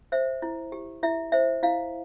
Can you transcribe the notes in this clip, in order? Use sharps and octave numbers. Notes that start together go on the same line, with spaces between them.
C5 E5
E4
G4
E4 E5
C5 E5
E4 F5